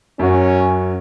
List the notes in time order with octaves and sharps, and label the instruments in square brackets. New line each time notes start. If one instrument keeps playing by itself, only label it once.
[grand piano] F#2 F#4 [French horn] C#4